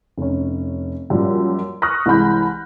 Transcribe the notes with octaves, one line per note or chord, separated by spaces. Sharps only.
F1 C#4
F#2 A#2 F3 G3
C#6 D#6 F6 F#6 A#6
C2 E3 G#3 B5 G6